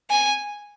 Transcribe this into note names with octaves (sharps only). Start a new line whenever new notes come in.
G#5